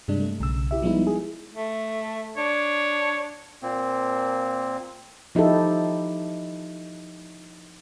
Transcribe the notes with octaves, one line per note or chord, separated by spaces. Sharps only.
G2 C3 G3 G#3 D4
A3
B1 C#3 E6
E4 G4 E5
F3 G3 G#3 B3 D#4 E4
G#4
A3
D4 C#5
A#2 A#3 C4
F3 D#4 E4 G4 A4